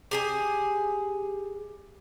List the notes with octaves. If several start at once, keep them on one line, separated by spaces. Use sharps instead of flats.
G4 G#4 G#5